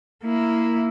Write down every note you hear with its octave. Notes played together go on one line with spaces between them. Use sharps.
A#3 E4